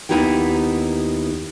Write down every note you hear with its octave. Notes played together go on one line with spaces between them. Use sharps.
D#2 B3 D#4 E4 G4 G5